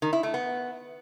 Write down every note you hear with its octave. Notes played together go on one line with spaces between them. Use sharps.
D#3
E4
A3
B3